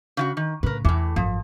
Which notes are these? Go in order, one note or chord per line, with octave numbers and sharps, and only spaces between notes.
C#3 E4 F#4
D#3
A2 C#3 A#4 B4
E2 A2 E3
G#1 F#2 F3